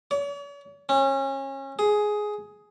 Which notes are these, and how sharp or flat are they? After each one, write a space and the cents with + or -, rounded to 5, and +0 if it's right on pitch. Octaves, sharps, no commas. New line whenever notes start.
C#5 +45
C#4 -30
G#4 +10